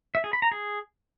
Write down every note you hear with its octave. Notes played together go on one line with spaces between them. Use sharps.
E5
G#4
B5
A#5
G#4